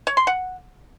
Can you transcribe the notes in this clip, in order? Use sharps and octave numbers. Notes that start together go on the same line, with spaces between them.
C#5
C6
F#5